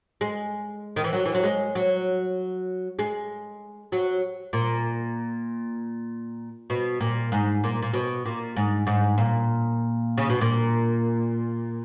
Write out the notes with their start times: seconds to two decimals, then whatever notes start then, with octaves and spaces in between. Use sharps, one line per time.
0.21 G#3
0.96 D#3
1.04 E3
1.13 F#3
1.25 E3
1.34 F#3
1.44 G#3
1.75 F#3
2.99 G#3
3.92 F#3
4.53 A#2
6.70 B2
7.01 A#2
7.32 G#2
7.64 A#2
7.82 A#2
7.93 B2
8.26 A#2
8.56 G#2
8.87 G#2
9.18 A#2
10.18 C#3
10.30 B2
10.41 A#2